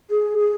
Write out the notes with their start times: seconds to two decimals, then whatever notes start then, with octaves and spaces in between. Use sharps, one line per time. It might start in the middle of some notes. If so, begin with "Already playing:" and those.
0.11 G#4
0.38 G#4